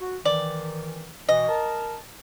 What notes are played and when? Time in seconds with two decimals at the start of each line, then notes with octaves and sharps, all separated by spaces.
0.01 F#4
0.25 D#3 E3 D5
1.29 B2 E3 D#5
1.49 A#4 A5